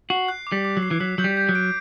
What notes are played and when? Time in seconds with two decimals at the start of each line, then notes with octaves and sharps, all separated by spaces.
0.10 F#4 C7
0.28 F#6
0.47 D6
0.52 G3
0.65 D6
0.77 F#3
0.83 C7
0.91 E3
1.00 F#3 B6
1.18 F#3 G6
1.24 G3
1.37 G6
1.49 F#3
1.55 D7